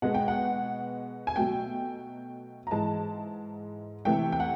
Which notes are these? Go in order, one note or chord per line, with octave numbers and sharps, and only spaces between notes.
B2 G#3 B3 F#5
G5
F#5
G#5
B2 F#3 A3 G5
A#5
G#2 E3 G#3 A5
C3 E3 A3 G5
G5
F#5